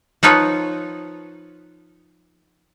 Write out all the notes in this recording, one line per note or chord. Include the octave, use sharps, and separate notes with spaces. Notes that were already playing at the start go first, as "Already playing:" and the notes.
F3 D#4 F4 B4 C#5